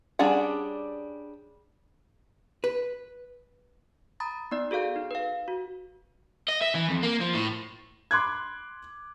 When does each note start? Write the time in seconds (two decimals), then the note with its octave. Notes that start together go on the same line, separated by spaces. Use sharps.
0.19 G3 C#4 D4 G#4 F#5
2.64 B4
4.20 A#5 B5 D#6 A6
4.51 B3 D#4 D5
4.71 F#4 G#4 A4 F5 G6
4.96 D#4
5.11 B4 F5
5.48 F#4
6.49 D#5
6.62 E5
6.75 E3
6.89 F2
7.03 A#3
7.21 F3
7.34 A2
8.11 B5 C6 D6 F#6 G#6